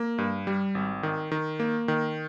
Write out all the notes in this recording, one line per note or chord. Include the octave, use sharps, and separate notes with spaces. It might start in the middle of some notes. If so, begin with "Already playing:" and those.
Already playing: A#3
G2
G3
G#1
D#3
D#3
A#3
D#3